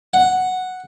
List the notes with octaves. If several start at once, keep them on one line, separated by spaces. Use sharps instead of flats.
F#5